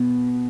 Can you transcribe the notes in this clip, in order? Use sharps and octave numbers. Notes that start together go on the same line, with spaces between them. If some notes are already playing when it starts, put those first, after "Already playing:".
Already playing: B2 B3